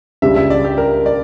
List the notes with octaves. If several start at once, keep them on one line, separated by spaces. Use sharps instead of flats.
C#2 C#3 G3 D4 F4 E5
E5
D5
G4
A#4
D5